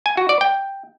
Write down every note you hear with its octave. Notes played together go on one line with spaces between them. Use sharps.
G#5
F#4
D5
G5